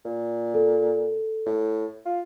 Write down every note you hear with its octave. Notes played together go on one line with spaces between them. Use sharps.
A#2
A4
A2
F4